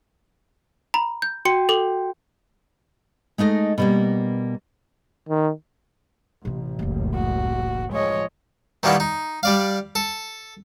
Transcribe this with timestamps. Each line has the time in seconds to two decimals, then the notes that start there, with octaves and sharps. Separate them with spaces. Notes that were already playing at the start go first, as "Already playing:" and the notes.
0.94 A#5 B5
1.22 G6
1.45 F#4 G5 C6 C#7
1.69 A4 D6 F#7
3.38 G#3 A3 D#4 D#5
3.78 B2 G3 A#3
5.29 D#3
6.45 A1 C3 C4
6.79 F1 C#2 F#2 A#3
7.14 F#4
7.92 F3 G#3 C#5 D#5
8.83 D#3 E3 G3 A#3 B3
9.00 D#4
9.43 G3 D5 F5
9.95 A4